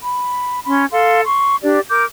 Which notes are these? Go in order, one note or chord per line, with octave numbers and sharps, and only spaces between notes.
B5
C#4 B5 C6
A4 F5 C6
C6 C#6
D4 G4 D5
A#4 D6 G6